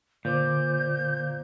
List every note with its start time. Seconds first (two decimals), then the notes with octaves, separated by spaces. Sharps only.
0.25 A#2 D3 C5 D6 G6